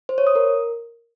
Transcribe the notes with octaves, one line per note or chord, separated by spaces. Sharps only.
C5
C#5
D#6
A#4